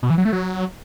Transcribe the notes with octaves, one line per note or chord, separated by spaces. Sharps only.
B2
E3
F#3
A3
F#3